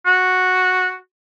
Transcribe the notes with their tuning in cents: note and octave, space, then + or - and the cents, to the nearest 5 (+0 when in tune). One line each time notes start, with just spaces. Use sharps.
F#4 -5